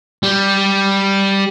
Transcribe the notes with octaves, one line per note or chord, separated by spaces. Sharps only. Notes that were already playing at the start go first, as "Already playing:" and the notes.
G3